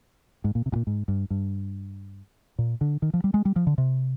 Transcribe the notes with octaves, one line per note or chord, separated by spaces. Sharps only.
G#2
A#2
C3
G#2
A#2
G#2
G2
G2
A#2
D3
D#3
F3
G3
G#3
G3
F3
D3
C3